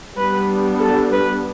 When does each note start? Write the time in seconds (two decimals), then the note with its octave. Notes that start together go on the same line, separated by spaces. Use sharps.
0.17 G3 B3 D4 B4
0.80 A4
1.11 B4